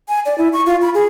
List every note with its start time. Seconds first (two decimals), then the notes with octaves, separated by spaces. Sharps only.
0.09 G#5
0.26 D5
0.38 E4
0.53 C#6
0.66 F4
0.82 B5
0.94 G#4